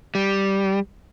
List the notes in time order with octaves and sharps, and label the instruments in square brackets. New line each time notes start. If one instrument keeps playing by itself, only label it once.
[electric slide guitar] G3